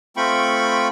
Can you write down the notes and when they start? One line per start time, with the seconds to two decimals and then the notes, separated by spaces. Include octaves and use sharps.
0.17 A3 C4 F4 G5 B5 C#6